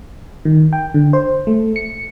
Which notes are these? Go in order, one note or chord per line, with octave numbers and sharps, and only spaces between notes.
D#3
G5
D3
C5
A3
C#7